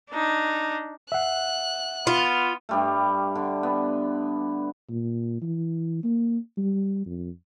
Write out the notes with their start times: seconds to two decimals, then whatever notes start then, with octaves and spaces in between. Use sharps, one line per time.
0.11 D4 D#4
1.12 E5 F#5 F#6
2.07 B3 F4
2.69 G2 G3 A3
3.35 D3
3.63 B3
4.89 A#2
5.42 E3
6.04 A#3
6.57 G3
7.06 F2